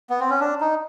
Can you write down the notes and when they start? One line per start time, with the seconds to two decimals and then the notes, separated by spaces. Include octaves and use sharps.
0.10 B3
0.20 C4
0.30 C#4
0.40 D4
0.61 D#4